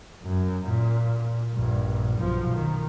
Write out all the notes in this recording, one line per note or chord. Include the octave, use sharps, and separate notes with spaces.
F#2
A#2
A#1 G2
B1 F3
D#3